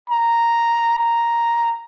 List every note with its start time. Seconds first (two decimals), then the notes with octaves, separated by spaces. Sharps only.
0.10 A#5
0.99 A#5